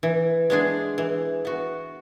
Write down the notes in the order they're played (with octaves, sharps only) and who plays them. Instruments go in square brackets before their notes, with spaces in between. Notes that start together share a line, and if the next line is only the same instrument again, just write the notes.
[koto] E3
G#3 B3 D4 G#4
E3
B3 F#4